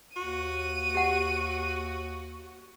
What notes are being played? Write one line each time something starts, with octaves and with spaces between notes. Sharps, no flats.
D#2 F#4 D#7
G4 F#5